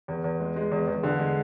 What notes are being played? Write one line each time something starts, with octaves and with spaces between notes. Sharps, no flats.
E2
E2
G#3
G#3
E2
E2
D3
G#3